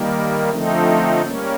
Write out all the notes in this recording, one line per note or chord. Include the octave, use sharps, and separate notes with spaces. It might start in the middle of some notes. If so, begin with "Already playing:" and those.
Already playing: D#3 G3 A#3
D3 F3 A3 C4 D#4
G3 A#3 C#4